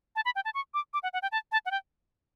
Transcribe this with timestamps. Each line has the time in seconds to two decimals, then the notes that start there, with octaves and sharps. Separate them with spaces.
0.16 A5
0.25 B5
0.35 G5
0.45 A5
0.54 C#6
0.74 D6
0.94 D6
1.03 F#5
1.13 F#5
1.22 G5
1.32 A5
1.52 A5
1.66 F#5
1.71 G5